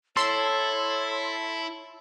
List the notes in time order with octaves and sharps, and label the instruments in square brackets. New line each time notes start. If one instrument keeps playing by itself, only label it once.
[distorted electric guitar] E4 [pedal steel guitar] A4 [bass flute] C#5 [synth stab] C6 E6